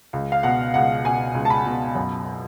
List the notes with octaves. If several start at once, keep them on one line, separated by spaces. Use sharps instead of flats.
C#2
F5
B2 F#5
C#2 F#5
B2 G#5
C#2
A5
B5
B2
F#2